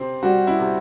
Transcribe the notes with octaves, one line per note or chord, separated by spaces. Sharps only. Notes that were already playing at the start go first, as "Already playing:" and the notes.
Already playing: C3 C4
G3 F#4
E4
C3